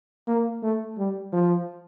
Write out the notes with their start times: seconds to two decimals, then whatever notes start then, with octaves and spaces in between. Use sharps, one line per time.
0.27 A#3
0.63 A3
0.98 G3
1.33 F3